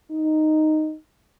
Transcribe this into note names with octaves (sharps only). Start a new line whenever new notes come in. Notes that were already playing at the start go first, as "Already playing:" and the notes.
D#4